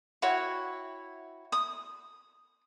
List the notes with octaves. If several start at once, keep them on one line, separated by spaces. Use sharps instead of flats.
E4 F#4 C#5 G5
D#6